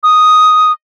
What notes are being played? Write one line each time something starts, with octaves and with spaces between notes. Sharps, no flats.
D#6